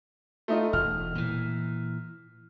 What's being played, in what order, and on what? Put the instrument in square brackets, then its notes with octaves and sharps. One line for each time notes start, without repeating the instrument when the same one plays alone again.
[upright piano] A3 D#4 F4
[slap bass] E1 [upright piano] F6
[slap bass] A#2 E3